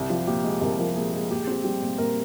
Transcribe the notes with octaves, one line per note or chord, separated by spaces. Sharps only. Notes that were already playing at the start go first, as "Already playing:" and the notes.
Already playing: C2
F3 G4
A#2 G4
G#3 G#4
C2 A#4
F3 A#4
A#2 G#4
G#3 G#4
A#2 G4
G#4
C4 G4
G3 G4
A#2
A#2 A#4